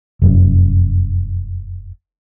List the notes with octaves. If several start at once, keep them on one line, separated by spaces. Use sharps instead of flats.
F1 F#2